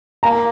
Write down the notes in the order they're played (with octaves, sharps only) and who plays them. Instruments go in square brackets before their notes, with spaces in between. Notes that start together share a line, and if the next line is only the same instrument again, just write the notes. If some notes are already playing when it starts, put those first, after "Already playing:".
[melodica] A#3 [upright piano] A#5